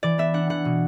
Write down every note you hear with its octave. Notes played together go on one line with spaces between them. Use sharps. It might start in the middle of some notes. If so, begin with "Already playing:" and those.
E3 D5
B3 E5
D4 F#5
E3 F#5
B2